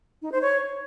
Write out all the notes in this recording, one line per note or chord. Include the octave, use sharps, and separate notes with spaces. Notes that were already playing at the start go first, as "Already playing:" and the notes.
D#4
C5
C#5